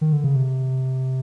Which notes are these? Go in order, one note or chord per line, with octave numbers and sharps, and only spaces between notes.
D#3
D3
C#3
C3